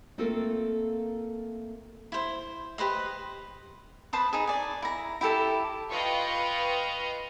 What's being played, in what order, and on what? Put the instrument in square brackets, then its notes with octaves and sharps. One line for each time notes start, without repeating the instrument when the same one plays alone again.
[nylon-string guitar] A3 A#3 C4 F4 A4 A#4
[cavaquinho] E4 C5
G4 B4 C5 D#5
B4 C5 A5 D#6
D#4 G#4
D5 G#5
E4 A#5
E4 G4 A4 A5
[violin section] F4 B4 D#5 F5 G5 C#6